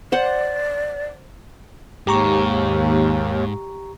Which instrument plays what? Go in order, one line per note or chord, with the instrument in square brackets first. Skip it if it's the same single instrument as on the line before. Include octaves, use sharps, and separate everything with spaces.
[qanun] C5 F#5 [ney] D5
[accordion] D#2 [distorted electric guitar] G#2 [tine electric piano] G4 A#5 C#6